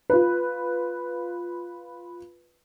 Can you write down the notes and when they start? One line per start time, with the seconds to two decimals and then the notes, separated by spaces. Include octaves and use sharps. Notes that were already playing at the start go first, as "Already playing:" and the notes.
0.10 F4 B4